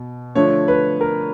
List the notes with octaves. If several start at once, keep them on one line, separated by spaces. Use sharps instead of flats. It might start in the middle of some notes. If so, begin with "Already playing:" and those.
Already playing: B2
D3 F3 A3 C#5
B4
A#4